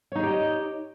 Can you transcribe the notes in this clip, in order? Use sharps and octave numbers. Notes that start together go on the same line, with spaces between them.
D#4 G4 G#4 C#5 D#5